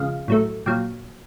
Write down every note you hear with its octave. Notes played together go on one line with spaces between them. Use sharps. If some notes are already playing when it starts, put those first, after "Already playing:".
Already playing: F2 C#3 F3 G#3 D#5 F5
A2 F#3 A3
A#2 F#3 F5 G5